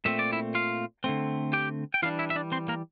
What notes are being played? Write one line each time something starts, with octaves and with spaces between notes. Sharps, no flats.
A#2 A3 C4 E5
D5
E4 E5
F4 F5
D3 A3 C4
G4 G5
G5
E3 G3 D4 F4 F5
E4 E5
E5
D4 D5
C4 C5
A#3 A#4